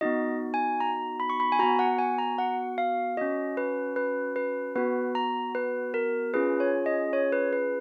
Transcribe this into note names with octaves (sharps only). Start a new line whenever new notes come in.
B3 D#4 F#4 D#5
G#5
A#5
B5
C#6
B5
G#5
B3 F#4 A#5
F#5
G#5
A#5
F#5
F5
C#4 F#4 D#5
B4
B4
B4
B3 F#4 B4
A#5
B4
A#4
C#4 F4 G#4 B4
C#5
D#5
C#5
B4
B4